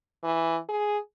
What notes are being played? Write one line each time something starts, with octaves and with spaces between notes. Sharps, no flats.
E3
G#4